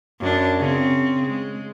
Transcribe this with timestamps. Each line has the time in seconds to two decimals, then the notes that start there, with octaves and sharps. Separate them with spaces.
0.20 F#2 D4
0.58 C#3 C4
1.27 G#3